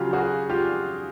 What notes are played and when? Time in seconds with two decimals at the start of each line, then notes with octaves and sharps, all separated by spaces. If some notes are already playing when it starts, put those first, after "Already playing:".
Already playing: C#3 F#3 F4 G4
0.13 F#4 G#4
0.50 F4 G4